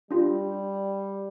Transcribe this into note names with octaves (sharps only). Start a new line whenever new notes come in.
G3 D4 F4 G4